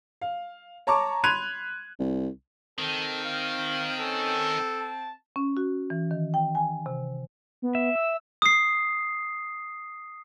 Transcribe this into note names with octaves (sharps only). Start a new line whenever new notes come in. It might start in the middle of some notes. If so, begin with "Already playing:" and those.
F5
C#5 A5 A#5 C#6 D6
B5 C6 F#6 G#6 D#7 F7
C2
D#3 C4 A4
F5
C#4 A4
A5
C#4
F#4
E3
D#3
G5
G#5
C3
B3
E5
E6
D#6 C7